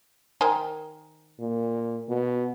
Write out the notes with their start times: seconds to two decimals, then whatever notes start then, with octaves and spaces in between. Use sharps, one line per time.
0.41 D#3 C5 G#5
1.40 A#2
2.09 B2